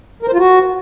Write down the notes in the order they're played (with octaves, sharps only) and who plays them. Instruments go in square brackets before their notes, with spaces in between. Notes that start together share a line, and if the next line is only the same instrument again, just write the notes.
[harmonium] A#4
C5
F4
F#4